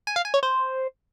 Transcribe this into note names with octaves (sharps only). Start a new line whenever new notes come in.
G#5
F5
G#5
C#5
C5